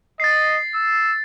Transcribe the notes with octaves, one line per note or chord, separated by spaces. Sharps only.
D#5 A6 C7
E6